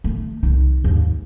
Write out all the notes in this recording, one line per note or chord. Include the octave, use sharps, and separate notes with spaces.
D#3 A3
C2 D#3
D#2 G#2